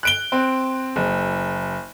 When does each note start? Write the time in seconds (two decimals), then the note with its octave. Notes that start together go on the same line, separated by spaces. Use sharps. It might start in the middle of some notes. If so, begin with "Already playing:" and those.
0.03 F#6 D7 G7
0.32 C4
0.96 F#1